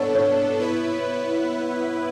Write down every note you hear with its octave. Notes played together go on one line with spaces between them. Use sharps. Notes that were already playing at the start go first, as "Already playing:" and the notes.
Already playing: B3 D4 A4 C#5
C#5
B3 E4 B4